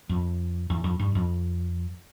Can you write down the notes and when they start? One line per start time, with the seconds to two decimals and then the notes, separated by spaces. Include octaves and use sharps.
0.09 F2
0.70 E2
0.84 F2
0.99 G2
1.15 F2